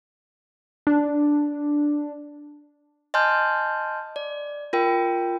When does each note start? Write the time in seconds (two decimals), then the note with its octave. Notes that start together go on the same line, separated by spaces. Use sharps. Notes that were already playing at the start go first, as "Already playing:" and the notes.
0.87 D4
3.14 D#5 G#5 A5 C6 F6 G6
4.16 D5
4.73 F4 A#4 G5